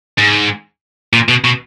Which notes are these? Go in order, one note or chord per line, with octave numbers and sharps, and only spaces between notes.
G#2
A#2
B2
B2